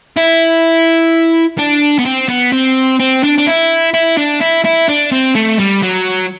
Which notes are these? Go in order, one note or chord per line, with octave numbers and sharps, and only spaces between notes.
E4
D4
B3
C4
B3
C4
C4
D4
D4
E4
E4
D4
E4
E4
D4
C4
A3
G3
F#3